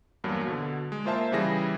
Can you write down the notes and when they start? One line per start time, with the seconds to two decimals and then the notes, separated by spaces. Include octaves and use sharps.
0.24 E2 G2 F#3 A#3
0.47 B2 D3
0.92 G#3
1.05 A#3 F4 C5 E5 A5
1.32 C#3 E3 G3 E4 G#4 A#6